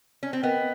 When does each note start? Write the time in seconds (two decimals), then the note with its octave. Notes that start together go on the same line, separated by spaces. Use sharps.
0.23 C#4
0.33 C4
0.43 B3 A#4 D#5 G5